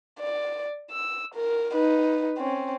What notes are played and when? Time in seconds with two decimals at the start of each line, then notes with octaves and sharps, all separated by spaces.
0.20 D5
0.91 E6
1.34 A#4
1.73 D#4 B4
2.38 C4 C#4